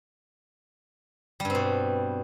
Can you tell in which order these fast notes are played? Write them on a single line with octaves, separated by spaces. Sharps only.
G3 G2 C4 B2